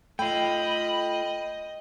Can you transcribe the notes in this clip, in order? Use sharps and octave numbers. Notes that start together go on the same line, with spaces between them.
A3 F4 D#5 G5 B5